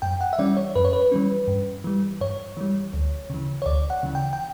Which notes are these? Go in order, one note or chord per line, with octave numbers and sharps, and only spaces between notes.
F#2 G5
F#5
E5
E3 G3 C#4 D5
C#5
F#2 B4
C#5
B4
E3 G3 C#4
G2
E3 G3
G2 C#5
E3 G3
D2
C#3 E3
C#5
D2 D5
F#5
C#3 E3
G5
G5